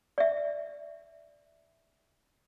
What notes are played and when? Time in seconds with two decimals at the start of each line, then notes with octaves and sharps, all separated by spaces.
0.18 D5 E5